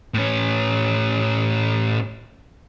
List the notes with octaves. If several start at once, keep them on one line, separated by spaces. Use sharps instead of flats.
A2 C#4